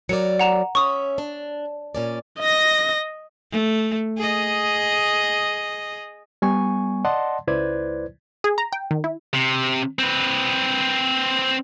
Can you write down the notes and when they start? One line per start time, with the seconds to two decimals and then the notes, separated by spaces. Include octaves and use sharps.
0.09 F#3 A#4 D5 C#7
0.39 F#5 A#5 E7
0.75 C#4 C#5 E5 C#6 D#6
1.18 D4
1.95 A#2 C#4 D5
2.40 D#5 A#6
3.52 A3
4.18 G#4 D#5
6.42 G3 B3 G#5 C#6
7.05 D5 D#5 F#5 A5 C6
7.47 C#2 E4 B4 C5 D5 G#6
8.44 G#4
8.58 A#5
8.73 G5
8.91 D#3
9.04 E4
9.34 C3
9.99 C4 B4